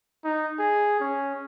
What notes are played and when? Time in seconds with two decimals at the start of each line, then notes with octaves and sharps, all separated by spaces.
0.24 D#4
0.59 G#4
1.00 C#4